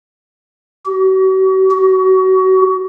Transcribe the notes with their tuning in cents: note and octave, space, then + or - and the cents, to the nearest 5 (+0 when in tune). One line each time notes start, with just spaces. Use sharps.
F#4 +45
F#4 +30